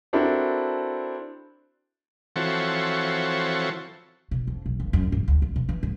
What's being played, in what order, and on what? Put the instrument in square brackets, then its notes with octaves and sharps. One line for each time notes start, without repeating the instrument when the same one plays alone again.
[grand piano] C4 D4 E4 F#4 A4 A#4
[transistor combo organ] E3 F3 C4 F#4 A4 C#5
[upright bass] B2
F2
B1
G1
F#2
G#2
D2
G#1
B2
E3
G#2